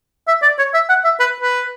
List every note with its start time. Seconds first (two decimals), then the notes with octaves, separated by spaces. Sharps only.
0.28 E5
0.42 D5
0.58 C#5
0.74 E5
0.89 F#5
1.04 E5
1.20 B4
1.40 B4